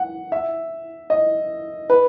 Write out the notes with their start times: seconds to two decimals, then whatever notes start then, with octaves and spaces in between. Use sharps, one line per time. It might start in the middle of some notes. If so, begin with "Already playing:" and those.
Already playing: F#5
0.32 E5
1.10 D#5
1.90 B4